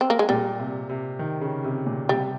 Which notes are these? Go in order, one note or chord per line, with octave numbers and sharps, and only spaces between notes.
C4
A#3
G#3
A#2 G3
C3
C3
D#3
C#3
C3
A#2
C3 G3